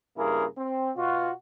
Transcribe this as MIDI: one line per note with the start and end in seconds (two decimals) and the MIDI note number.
0.18 0.45 43
0.18 0.45 49
0.18 0.45 58
0.18 0.45 64
0.18 0.45 68
0.18 0.45 70
0.58 0.90 60
0.97 1.31 47
0.97 1.31 65
0.97 1.31 66